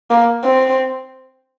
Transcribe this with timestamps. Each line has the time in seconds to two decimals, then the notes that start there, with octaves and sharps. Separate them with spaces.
0.10 A#3
0.44 C4